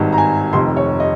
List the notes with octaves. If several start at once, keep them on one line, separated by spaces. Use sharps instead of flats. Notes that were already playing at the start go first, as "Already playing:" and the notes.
Already playing: G#1 G2 D#3
A#5
G#5
F1 F2 C3 D#3 C6
C#5
D#5